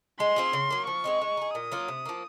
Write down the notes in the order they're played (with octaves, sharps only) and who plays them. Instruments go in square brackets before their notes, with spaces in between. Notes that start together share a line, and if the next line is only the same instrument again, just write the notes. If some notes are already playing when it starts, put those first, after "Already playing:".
[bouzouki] G#3 [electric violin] C6
[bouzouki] C4 F4 G#4
C#3
F#3 A#3
[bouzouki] F3 [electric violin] C#6
[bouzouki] G#3 C4 D#4
G#3
D#4 G#4
[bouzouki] A#2 [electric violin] D#6
[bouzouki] F#3 A#3 F4
C3
F3 A#3